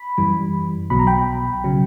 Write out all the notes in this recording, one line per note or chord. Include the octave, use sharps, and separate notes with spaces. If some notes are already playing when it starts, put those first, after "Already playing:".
Already playing: B5
F#2 E3 G3
B1 B2 F#3 B5
A#5
G5 B5
C#3 F#3